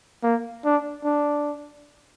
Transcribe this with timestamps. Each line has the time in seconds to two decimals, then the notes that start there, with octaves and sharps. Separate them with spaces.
0.23 A#3
0.65 D4
1.05 D4